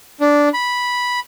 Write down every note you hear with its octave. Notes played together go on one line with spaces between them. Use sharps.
D4
B5